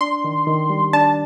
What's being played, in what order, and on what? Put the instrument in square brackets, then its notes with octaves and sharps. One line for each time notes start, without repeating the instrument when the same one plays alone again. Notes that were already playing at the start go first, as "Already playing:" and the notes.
[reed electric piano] D4 [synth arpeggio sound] C6
[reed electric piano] D#3
D#3
G3
[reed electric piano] D4 [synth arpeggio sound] A5